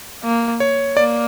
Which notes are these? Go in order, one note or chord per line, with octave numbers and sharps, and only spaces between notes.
A#3
C#5
A#3 D5